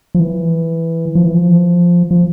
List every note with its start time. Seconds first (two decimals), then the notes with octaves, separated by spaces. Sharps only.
0.15 F3
0.20 E3
1.15 F3
1.25 E3
1.34 F3
2.11 F3